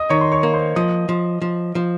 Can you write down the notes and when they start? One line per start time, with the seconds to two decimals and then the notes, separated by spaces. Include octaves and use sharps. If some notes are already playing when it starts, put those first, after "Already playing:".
Already playing: D#5 D#6
0.10 D#3 C#5 C#6
0.21 C6
0.32 C#5 C#6
0.43 A#3
0.54 C5 C6
0.76 F3 D#5 D#6
1.09 F3
1.42 F3
1.75 F3